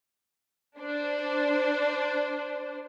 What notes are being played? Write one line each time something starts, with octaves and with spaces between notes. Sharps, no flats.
D4 C5